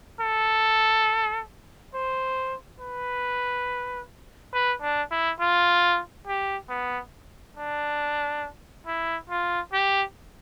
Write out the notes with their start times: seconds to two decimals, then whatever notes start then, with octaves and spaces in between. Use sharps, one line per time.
0.21 A4
1.94 C5
2.80 B4
4.54 B4
4.82 D4
5.11 E4
5.40 F4
6.27 G4
6.69 B3
7.57 D4
8.87 E4
9.30 F4
9.73 G4